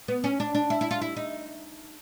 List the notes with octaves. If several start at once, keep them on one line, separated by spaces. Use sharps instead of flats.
B3
C#4
D4
D4
E4
E4
F4
E4
D#4